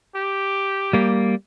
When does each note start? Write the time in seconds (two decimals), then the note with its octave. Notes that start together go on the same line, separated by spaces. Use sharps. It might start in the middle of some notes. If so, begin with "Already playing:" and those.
0.16 G4
0.93 G3 A#3